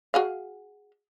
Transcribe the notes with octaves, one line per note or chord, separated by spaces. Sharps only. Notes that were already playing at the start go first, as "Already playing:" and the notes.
F#4 G#4 F5